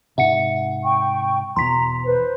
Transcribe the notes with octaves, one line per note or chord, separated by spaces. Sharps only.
G#2 C3 E5 F#5 C#7
G5 C#6
E2 B2 A#5 C6 B6
B4 C5